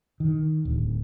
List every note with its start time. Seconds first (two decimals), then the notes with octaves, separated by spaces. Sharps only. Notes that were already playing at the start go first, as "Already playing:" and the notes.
0.20 D#3
0.65 D1